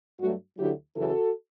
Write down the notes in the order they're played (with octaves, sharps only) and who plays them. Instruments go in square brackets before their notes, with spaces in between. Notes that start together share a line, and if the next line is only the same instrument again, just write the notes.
[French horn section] G2 F#3 A3 D4 F#4
D2 D3 F#3 A3 E4 G4
F#2 C#3 E3 F#4 A4